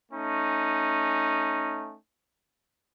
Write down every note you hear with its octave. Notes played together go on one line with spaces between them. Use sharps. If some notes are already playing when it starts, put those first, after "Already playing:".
A3 C#4 D#4